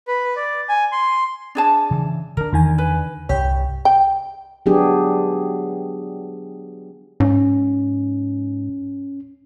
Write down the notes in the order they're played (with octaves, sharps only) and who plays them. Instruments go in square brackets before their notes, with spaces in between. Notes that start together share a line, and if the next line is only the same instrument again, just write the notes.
[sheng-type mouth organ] B4
D5
G#5
C6
[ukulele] D4 G#4 A5
[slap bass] C#3 E3
[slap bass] D3 D4 [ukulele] A#4
[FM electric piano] E2 D#3 G#5
[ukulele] B4
[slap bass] C2 G2 [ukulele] G4 [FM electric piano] C#5 G5
[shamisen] G5
[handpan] F#3 B3 D4 G4 G#4
[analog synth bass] G#2 [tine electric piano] C#4